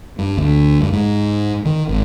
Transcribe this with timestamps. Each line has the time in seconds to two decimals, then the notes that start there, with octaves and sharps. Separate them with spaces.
0.19 G2
0.37 D2
0.81 G2
0.93 G#2
1.65 D#3
1.89 G#1